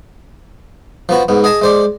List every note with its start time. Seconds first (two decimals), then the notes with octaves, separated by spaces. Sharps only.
1.09 F3 B3 F#4
1.28 G#2 B3
1.44 G#4 D#5 G#5 A5
1.61 G#3 C5 D5